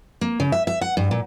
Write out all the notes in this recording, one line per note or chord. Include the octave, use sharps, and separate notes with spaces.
A#3
C#3
E5
E5
F#5
G2
A#2